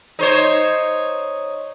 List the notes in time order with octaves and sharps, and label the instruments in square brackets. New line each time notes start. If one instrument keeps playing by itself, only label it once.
[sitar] D#4 C5 C#5